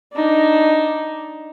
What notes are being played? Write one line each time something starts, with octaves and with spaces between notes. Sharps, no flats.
D4 D#4